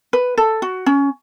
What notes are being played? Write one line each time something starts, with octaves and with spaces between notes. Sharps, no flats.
B4
A4
F#4
C#4